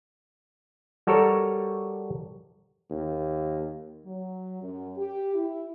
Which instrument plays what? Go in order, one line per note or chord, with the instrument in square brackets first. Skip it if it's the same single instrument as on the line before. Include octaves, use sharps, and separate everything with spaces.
[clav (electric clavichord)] G3 F#4 A4 A#4 C#5
[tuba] D#2
[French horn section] F#3
F#2
G4
E4